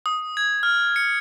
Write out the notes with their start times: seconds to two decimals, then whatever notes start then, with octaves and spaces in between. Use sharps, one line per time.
0.06 D#6
0.37 G#6
0.63 F6
0.96 C#7